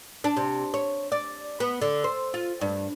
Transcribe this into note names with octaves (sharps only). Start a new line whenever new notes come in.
D4
C3
C#5
D5
B3
D3
C5
F4
G2